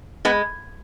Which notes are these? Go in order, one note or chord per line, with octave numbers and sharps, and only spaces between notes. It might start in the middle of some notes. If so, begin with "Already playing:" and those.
G#3 B3